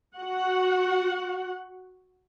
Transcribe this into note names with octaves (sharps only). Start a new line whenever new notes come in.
F#4 F#5